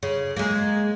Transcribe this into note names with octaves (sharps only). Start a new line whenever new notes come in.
C#3
G#3 A#3